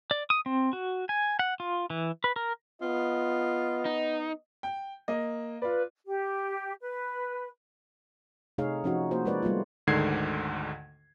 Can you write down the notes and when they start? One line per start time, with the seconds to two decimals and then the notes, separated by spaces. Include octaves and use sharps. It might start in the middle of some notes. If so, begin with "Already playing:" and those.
0.11 D5
0.30 D#6
0.46 C4
0.73 F#4
1.09 G#5
1.39 F#5
1.60 F4
1.90 E3
2.24 B4
2.36 A#4
2.82 B3 F4 D#5
3.85 D#4
4.63 G5
5.08 A#3 D#5
5.62 F4 B4 D5
6.06 G4
6.81 B4
8.58 C3 A3 D#4 G#4 C#5 F5
8.84 F3 C#4 D#4 F#4
9.11 A#3 F#4 C5
9.25 G#3 D#4 A#4 B4 C#5 D5
9.42 G3 A3 B3 F4
9.87 D2 G#2 D3 D#3 G#6 C7